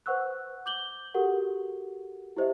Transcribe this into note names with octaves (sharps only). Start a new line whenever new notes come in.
B4 C5 F#5 C#6 E6 F#6
D6 G6 F#7 G7
F#4 G4 A4 A#4 F#5
E4 G4 C5 D#5 E5